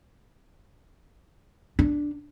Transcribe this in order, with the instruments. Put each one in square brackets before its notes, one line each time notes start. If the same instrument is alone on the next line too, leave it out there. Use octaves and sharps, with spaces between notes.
[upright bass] D4